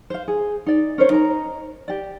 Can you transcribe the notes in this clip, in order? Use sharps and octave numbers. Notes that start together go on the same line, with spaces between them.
C5 F5
G#4
D#4 D5
C#4 A#4 C5 C#5
D#4 A#4 A#5
G4 D5